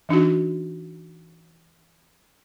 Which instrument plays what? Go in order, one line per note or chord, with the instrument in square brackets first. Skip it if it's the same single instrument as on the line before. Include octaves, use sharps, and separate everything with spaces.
[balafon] E3 D4 D#4 F#4